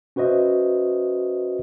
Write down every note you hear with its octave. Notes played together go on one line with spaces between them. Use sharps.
C#4 F#4 B4 C5 D#5 E5